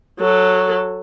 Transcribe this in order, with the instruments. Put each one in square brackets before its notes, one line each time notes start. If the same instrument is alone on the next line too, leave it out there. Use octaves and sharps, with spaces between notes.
[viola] F#3 A4